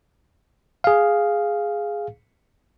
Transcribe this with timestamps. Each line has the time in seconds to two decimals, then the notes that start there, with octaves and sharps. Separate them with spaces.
0.84 G#4 F5